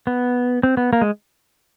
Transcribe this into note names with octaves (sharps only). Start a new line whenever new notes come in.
B3
C4
B3
A#3
G#3